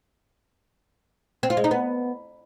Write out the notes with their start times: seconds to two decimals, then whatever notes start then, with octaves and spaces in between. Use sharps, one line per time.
1.43 C4
1.50 F4
1.57 G#3
1.64 D#4
1.71 B3